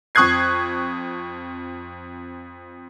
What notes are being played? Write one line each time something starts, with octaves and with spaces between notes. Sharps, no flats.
F2 C#6 D#6 F#6 G#6 C7